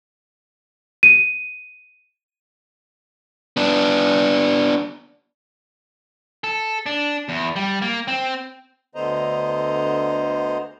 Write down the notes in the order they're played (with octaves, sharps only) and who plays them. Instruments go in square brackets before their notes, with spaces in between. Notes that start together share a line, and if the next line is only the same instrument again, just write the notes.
[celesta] D#7
[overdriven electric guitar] B3 D4
[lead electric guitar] A4
D4
E2
G3
A#3
C4
[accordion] D2 D3 B3 C5 D#5 A#5